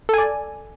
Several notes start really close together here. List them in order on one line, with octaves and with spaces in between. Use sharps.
A4 G#5 D5